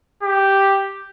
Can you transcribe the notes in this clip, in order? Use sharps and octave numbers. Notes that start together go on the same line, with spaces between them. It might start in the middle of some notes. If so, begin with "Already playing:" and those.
G4